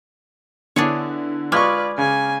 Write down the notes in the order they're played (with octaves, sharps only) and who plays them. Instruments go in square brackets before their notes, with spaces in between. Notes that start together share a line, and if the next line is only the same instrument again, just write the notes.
[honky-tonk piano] D3 B3 E4 [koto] D4 G#4 C#5
[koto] G#3 [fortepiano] F4 C#6 [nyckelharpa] B4 D5 [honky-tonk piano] D6 F6 G#6
[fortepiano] C#3 [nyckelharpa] G#5